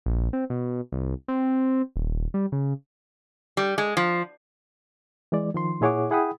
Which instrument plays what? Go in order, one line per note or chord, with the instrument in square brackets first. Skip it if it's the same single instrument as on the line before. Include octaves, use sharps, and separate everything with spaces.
[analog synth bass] A#1
C4
B2
C2
C4
D#1
G3
C#3
[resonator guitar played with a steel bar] G3
G#3
F3
[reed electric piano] E3 G#3 D5
D#3 F3 C6
A#2 E4 G#4 C#5 F#5 D6
E4 G#4 F#5 G5 B5 D#6